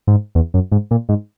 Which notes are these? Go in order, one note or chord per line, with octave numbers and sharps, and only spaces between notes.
G#2
E2
F#2
G#2
A#2
G#2